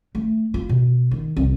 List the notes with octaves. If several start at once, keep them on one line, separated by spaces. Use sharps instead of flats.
A3
F4
B2
D#3
C2